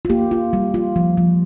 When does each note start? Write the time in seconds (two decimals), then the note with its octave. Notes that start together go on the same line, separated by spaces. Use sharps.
0.05 F4
0.10 A#3 G4
0.31 F4
0.53 G3
0.74 F4
0.96 F3
1.17 F3